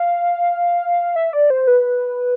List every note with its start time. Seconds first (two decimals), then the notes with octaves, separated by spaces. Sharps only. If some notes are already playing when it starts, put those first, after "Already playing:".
Already playing: F5
1.16 E5
1.33 D5
1.50 C5
1.67 B4